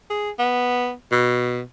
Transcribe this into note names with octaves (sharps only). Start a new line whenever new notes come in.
G#4
B3
B2